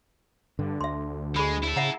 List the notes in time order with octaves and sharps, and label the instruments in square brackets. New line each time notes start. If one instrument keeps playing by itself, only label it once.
[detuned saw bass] G2 [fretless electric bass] D3
[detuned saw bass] D2 [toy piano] E5 C6
[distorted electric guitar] G#3 [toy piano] G#4 B5
[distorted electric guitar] E4 A4
[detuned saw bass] C#3 [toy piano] E5 F#5 A#5